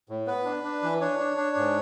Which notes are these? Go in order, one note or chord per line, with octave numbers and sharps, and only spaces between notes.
A2
B3 B4
D4
D4
E3
D4 C#5
D4
D4
G#2